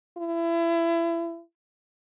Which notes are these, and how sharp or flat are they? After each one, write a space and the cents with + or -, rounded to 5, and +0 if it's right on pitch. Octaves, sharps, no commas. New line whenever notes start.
E4 +30